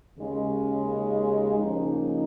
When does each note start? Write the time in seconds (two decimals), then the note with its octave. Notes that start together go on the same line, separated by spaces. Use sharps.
0.17 D#2 C#3 G#3
1.58 D#2 C#3 F3 A#3 D#4